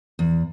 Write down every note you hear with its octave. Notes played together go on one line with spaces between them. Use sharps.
E2